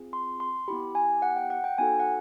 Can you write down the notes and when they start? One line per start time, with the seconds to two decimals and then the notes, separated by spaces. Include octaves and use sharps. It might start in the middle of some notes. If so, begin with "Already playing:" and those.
Already playing: C4 F4 G#4
0.13 C6
0.40 C6
0.68 B3 E4 G4 B5
0.95 G#5
1.22 F#5
1.37 G5
1.50 F#5
1.64 G5
1.78 B3 D#4 F#4 A4 G#5
2.00 F#5